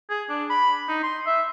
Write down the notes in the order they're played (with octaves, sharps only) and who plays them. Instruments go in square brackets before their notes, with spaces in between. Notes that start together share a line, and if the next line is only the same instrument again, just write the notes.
[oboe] G#4
D4
B5
D#4
C6
E5